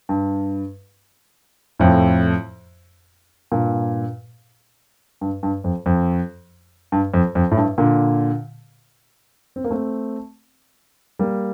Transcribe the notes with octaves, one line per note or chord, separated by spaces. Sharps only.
G2
F2 A2
G2 A#2
G2
G2
F2
F2
G2
F2
F2
A2
G2
A#2 D3
C4
A#3
A3 C4
G3 A#3